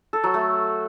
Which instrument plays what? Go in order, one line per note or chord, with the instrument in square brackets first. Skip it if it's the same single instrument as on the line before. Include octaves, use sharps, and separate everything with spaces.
[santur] A4
F#3
A3